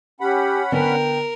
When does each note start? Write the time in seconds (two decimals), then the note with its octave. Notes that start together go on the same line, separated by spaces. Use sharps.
0.21 C#4 G4 F#5 B5
0.72 D3 B3 D4 A#4 G5